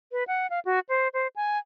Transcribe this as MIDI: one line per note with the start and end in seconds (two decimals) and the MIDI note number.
0.12 0.24 71
0.28 0.47 78
0.50 0.60 77
0.65 0.80 66
0.89 1.08 72
1.14 1.28 72
1.36 1.58 80